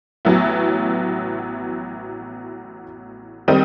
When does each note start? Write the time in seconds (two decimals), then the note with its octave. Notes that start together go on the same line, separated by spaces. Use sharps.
0.25 A1 A2 F#3 B3 E4
3.48 D#3 G3 C4 D#4